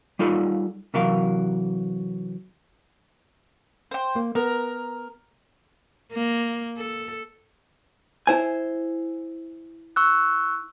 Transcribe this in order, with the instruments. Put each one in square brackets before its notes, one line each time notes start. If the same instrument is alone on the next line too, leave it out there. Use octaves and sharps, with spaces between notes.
[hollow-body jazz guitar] G3 D#4 F4 A4 B5
C3 E3 F#3 A#4 F5
[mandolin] C5 G5
[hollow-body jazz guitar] A#3
[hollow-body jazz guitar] B3 [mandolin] A#4
[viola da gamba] A#3
A4
[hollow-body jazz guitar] E4 C5 G#5
[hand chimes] C#6 E6 F#6